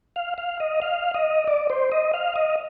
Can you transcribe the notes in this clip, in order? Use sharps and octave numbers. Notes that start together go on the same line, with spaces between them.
F5
F5
D#5
F5
D#5
D5
C5
D#5
F5
D#5